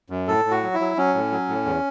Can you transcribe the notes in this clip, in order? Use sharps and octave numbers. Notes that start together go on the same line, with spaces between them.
F#2
A2 A4
A2
F#4
F#3
E4
F#3
F#3 C#4
A2
F#3
A2
E2